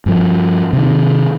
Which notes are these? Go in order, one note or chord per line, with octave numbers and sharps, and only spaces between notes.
G2 F3
C3 D#3